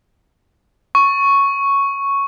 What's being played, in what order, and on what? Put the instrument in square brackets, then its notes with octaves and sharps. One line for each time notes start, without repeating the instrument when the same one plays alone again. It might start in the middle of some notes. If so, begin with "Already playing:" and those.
[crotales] C#6